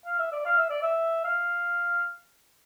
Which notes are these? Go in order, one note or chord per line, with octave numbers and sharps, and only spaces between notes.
F5
E5
D5
F5
E5
D5
E5
F5